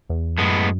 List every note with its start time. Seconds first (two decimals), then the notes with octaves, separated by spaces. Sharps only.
0.10 E2
0.38 F#2 A2 G#3 B3